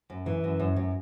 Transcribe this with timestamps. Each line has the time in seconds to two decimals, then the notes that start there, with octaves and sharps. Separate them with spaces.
0.10 F#2
0.26 E3
0.44 F#2
0.60 F#2
0.76 F#2